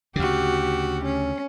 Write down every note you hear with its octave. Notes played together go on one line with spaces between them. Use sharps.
D2 C#3 F#4 G4
C#4